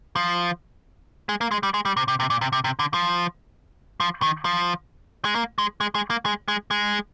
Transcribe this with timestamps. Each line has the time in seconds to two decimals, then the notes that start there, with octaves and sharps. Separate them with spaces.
0.16 F3
1.29 G#3
1.41 A#3
1.51 G#3
1.63 G3
1.74 G#3
1.85 G3
1.97 C3
2.08 C3
2.20 C3
2.30 A#2
2.41 C3
2.53 C3
2.64 C3
2.79 D3
2.94 F3
4.00 F3
4.22 D#3
4.45 F3
5.25 G#3
5.35 A#3
5.58 G#3
5.81 G#3
5.95 G#3
6.10 A#3
6.25 G#3
6.48 G#3
6.71 G#3